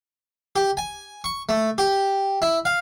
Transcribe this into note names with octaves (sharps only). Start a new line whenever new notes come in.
G4
G#5
C#6
A3
G4
E4
F5